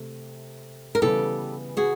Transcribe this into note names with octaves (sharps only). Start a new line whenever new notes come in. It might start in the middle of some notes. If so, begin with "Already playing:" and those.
Already playing: C3 A3
A#4
C#3 E3 G3 B3 G4 A4
F#4 G#4